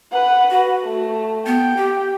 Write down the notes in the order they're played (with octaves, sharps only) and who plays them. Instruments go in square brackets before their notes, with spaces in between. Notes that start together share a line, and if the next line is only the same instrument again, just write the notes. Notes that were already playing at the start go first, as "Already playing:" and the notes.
[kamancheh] B4 F#5
[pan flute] F#4
[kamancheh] A3
[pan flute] B3 [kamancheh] G5
[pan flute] G4